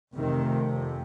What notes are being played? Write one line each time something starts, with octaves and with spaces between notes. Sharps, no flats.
F1 F2 C3 D#3